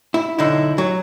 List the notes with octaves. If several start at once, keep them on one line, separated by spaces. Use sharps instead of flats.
E4
B1 D3 D#4 E4
F#3